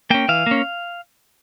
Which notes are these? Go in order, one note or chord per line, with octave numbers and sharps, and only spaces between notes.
A#3 C#4 G5
E3 F5
A#3 C#4